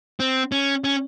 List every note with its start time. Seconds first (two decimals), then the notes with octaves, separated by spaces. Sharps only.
0.20 C4
0.52 C#4
0.84 C#4